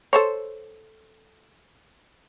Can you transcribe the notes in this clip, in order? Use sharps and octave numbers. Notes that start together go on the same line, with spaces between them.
A4 C5 C#5